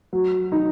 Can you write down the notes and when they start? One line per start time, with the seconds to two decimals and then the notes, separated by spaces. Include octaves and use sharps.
0.13 F#3
0.52 D#4